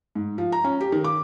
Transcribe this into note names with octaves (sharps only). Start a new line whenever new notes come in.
G#2
F3
A#5
C#4
G4
D#3
D6